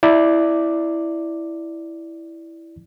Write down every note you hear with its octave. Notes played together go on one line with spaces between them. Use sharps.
E4 D5